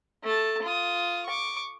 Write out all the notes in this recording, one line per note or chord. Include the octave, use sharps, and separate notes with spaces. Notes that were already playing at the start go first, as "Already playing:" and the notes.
A3 A5
F4 D#6
C#6 D6